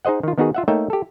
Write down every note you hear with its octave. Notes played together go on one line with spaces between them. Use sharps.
D#4 G#4 C5 D#5 F#5
D#3 F4
D#3 B3 D#4 F#4 G#4
F4 E5 F#5
A3 A#3 D#4 C#5 E5 G5
G4 A4